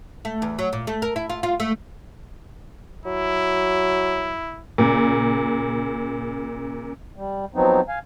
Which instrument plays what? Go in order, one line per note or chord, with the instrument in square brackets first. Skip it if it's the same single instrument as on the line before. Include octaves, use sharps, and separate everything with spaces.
[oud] A3
E2
F#3
A#2
A3
A#4
E4
F4
F4
A3
[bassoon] F#3 [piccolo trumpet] E4
[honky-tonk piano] A#2 C#3
[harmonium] G3
F3 F#3 B3 C4 D#4
F5 G#5